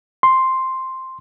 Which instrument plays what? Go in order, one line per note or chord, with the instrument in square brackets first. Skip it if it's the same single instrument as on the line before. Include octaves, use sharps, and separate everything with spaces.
[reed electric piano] C6